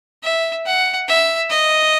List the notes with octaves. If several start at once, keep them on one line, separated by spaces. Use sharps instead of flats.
E5
F#5
E5
D#5